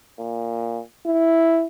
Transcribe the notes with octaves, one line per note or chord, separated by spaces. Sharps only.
A#2
E4